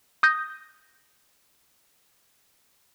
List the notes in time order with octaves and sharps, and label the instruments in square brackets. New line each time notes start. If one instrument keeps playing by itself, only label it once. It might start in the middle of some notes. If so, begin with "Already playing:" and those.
[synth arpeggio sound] D#6 G6 A#6